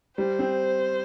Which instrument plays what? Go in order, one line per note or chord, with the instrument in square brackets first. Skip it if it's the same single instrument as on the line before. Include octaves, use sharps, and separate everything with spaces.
[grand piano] G3 [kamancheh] C5
[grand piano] C4